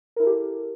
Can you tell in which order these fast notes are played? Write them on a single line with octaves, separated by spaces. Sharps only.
A#4 E4 A4 G4